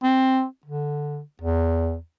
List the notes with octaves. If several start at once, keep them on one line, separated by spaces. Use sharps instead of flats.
C4
D3
E2